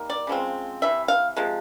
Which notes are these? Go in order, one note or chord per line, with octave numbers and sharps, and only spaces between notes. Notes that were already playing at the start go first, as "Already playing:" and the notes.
Already playing: D#3 G3 A#3
D5
C#3 F3 G#3 C4
C3 E3 E5
F5
C3 F3 G#3